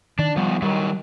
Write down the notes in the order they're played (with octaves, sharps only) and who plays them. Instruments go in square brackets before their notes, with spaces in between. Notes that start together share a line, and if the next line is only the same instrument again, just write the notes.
[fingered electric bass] D#3 [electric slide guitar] D4 D5
[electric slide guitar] F3 B3 [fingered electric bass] G3
[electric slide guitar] D#3 F#3 [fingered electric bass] G3